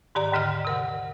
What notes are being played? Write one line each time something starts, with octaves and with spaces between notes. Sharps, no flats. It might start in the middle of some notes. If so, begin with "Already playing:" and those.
G#2 D#3 G4 D5 A#5
D#2 G#2 D3 D#5 F6
C3 A#4 F#5